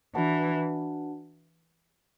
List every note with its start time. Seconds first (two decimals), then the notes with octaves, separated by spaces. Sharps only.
0.15 E3 D4 F#4 B4 F#5 A5